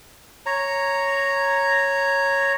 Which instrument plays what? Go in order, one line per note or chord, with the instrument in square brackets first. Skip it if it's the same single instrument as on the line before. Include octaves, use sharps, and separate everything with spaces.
[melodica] C#5 A#5